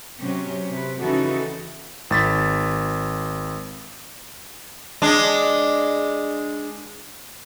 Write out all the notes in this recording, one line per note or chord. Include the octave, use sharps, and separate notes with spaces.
C3 F#3 C#4 G4
C3 B4
C#3 E3 D#4 F#4 A4
G#1 A6 B6
G#3 D4